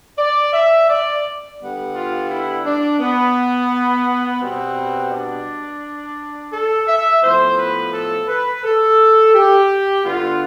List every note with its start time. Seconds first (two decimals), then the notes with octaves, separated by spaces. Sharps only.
0.18 D5
0.53 E5
0.89 D5
1.59 D3 G3 B3
1.95 F4
2.30 E4
2.65 D4
3.00 B3
4.41 B2 G3 B3 C4
5.12 D4
6.53 A4
6.88 E5
7.23 A2 F3 B3 C5
7.58 B4
7.93 A4
8.28 B4
8.64 A4
9.34 G4
10.04 G2 D3 G3 B3 F4